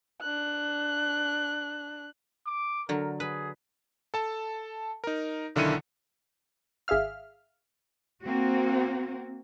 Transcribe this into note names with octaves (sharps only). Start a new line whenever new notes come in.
D4 F#6
D6
D3 F#3 A#4
G#4 B4
A4 A5
D#4 A#4
B1 D3 D#3 E4 C#7 D#7
G#1 G#4 E5 F5 F6
A#3 C4 F#4